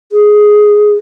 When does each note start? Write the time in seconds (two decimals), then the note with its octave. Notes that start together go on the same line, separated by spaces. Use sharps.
0.12 G#4